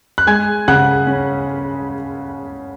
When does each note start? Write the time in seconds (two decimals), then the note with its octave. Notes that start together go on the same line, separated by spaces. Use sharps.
0.18 F#6
0.27 G#3 G#5 G#6
0.68 C#3 F#5 F#6
1.07 C#4